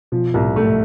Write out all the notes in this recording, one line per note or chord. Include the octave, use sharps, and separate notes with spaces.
B2 F3
C2 A2
G#2 A3